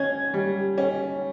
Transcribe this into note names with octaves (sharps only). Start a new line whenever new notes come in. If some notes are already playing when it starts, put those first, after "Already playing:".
Already playing: C#4 G#6
G3
C#4